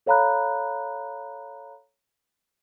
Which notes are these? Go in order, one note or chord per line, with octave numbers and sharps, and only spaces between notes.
A4 C#5 F5 A#5 B5 F#6